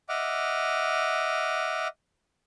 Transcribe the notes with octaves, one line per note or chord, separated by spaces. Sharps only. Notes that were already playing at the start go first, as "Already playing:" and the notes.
D#5 E5 F#5 D6 F6